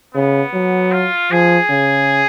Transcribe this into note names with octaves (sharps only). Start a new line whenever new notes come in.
C#3 B3
F#3
F4
F3 G#4
C#3